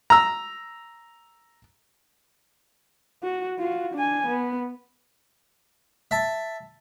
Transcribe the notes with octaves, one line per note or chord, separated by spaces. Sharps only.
A#5 E6
F#4
F4 F#4
D4 G#5
B3
E5 A5